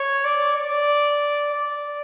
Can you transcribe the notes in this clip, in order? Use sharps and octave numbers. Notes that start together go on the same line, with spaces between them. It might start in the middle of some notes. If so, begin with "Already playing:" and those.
Already playing: C#5
D5
D5
D5